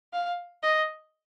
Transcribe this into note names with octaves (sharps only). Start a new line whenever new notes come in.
F5
D#5